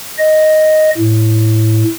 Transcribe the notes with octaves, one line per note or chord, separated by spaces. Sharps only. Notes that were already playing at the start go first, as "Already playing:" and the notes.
D#5
A2